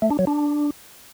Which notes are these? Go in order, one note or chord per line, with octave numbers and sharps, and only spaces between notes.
A3
D4
F#3
D4